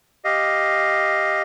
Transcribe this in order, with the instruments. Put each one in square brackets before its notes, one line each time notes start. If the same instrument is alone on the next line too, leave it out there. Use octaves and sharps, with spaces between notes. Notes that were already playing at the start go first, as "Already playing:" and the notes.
[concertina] G4 D#5 F5